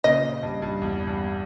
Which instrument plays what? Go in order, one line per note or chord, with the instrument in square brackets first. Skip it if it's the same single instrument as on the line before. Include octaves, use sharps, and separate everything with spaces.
[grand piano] A#2 C#3 [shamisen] D#5
[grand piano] G2
G2
E2
G2